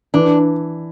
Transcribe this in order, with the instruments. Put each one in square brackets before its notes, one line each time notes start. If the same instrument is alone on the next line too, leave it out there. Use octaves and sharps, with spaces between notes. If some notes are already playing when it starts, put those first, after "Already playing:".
[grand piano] E3 [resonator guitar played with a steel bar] D4